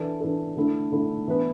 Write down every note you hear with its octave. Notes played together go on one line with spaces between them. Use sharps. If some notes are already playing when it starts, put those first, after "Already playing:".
Already playing: E3 D4 A4
E3 D4 A4
D3 A3 E4 A4
D3 A3 E4 A4
E3 B3 D4 B4